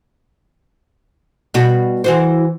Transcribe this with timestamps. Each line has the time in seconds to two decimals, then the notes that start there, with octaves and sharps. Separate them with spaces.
1.54 B2 G3 F#4
2.04 E3 F#4 C5